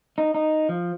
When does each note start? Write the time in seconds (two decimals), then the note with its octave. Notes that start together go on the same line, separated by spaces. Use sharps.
0.18 D#4
0.34 D#4
0.69 F3